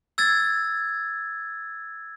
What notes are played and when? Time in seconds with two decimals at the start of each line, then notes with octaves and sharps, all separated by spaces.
0.18 E6 G#6 A6